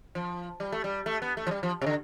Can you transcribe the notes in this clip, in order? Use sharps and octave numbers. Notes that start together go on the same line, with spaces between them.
F3
G3
A3
G3
A3
B3
A3
F3
G3
F3
C3
D3